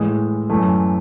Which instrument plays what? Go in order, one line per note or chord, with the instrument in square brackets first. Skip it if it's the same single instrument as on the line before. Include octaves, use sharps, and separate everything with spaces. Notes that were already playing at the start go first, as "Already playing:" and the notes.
Already playing: [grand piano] A2 E3 G#3
F#2 E3 A3